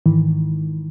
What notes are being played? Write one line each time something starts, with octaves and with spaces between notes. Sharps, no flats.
G#2 D#3 E3